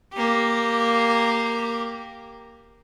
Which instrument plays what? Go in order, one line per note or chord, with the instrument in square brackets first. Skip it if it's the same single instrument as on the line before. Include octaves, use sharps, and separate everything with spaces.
[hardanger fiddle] A#3 G4